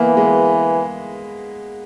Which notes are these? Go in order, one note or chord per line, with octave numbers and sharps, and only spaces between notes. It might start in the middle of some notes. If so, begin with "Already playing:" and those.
Already playing: E3 A#3 B3
G#3